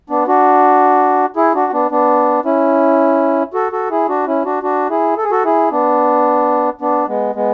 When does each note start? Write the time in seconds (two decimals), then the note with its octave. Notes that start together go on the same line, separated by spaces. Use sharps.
0.10 B3 D4
0.28 D4 F#4
1.36 E4 G#4
1.55 D4 F#4
1.73 B3 D4
1.91 B3 D4
2.45 C#4 E4
3.54 F#4 A4
3.72 F#4 A4
3.90 E4 G#4
4.08 D4 F#4
4.27 C#4 E4
4.45 D4 F#4
4.63 D4 F#4
4.90 E4 G#4
5.17 A4
5.24 G#4
5.31 F#4 A4
5.45 E4 G#4
5.71 B3 D4
6.81 B3 D4
7.08 G#3 B3
7.35 G#3 B3